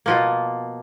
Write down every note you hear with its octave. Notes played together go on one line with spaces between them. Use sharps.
B2 F3 A#3